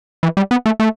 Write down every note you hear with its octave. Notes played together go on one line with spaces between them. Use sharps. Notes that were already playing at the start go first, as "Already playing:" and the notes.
E3
G3
B3
A3
A3